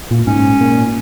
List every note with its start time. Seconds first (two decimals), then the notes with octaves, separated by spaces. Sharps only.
0.11 A#2
0.26 G#2 C#4
0.61 A#2